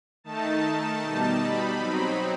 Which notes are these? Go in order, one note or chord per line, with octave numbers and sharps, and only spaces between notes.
D#3 A3 D#4 A5
B2 G3 D#4
B5
F#3 C4 D#4